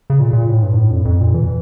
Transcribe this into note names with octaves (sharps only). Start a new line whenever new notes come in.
C#3
A#2
A#2
A2
G2
A2
F2
F2
A#2
E3